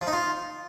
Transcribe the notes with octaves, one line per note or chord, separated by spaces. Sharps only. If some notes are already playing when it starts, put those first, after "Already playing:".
F3
D#4
F4